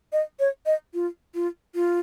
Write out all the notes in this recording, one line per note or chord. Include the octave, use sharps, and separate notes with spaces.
D#5
C#5
D#5
F4
F4
F4